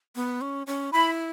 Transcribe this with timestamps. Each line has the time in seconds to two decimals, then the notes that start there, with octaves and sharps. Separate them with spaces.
0.16 B3
0.41 C#4
0.67 C#4
0.93 E4 B5